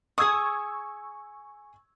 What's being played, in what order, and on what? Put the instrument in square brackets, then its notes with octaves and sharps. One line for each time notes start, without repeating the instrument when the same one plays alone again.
[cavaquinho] G#4 D#6 [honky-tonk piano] C#6 E6 G#6